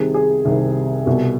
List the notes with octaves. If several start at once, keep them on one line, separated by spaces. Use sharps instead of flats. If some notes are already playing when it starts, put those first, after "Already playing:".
Already playing: C2 C3 D#3 G#4
G#4
C2 C3 D#3
C2 B2